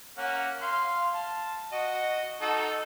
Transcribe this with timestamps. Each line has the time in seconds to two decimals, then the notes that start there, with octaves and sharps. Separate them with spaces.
0.18 A#3 C#4 F#5
0.62 F5 C6
1.15 A5
1.72 F#4 D#5
2.41 D#4 F#4 A4